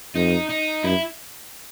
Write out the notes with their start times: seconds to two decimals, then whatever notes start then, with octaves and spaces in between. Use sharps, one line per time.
0.15 F2 D#4
0.50 D#4
0.83 F#2 E4